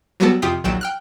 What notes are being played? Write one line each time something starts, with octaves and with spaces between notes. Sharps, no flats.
F#3 G3 B3 F#4 A4
F2 C3 F4 G4 D#6 B6
A#1 D#2 F#3 G5 E7
G5 F6 F#6